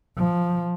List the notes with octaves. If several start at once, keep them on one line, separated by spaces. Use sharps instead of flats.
F3